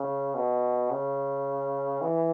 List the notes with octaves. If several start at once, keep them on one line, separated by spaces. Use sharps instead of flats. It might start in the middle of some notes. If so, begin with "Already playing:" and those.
Already playing: C#3
B2
C#3
E3